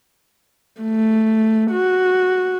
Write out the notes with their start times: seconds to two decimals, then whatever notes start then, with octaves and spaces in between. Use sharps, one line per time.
0.82 A3
1.71 F#4